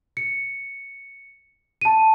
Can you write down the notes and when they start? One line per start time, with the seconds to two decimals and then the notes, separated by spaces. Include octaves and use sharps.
0.17 C#7
1.81 A5 D#7